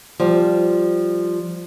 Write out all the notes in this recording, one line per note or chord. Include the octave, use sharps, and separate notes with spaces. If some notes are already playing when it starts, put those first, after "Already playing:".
F3 G3